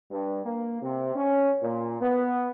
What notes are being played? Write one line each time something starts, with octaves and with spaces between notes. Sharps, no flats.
G2
A#3
C3
C#4
A#2
B3